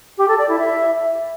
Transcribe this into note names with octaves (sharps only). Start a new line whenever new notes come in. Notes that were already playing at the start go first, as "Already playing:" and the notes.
G4
A4
D5
E4
E5